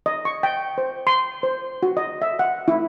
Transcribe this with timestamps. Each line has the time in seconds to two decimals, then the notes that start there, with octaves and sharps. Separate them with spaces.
0.06 D#5
0.25 C#6
0.43 G5
0.78 C5
1.07 C6
1.43 C5
1.83 F#4
1.97 D#5
2.22 E5
2.39 F#5
2.68 E4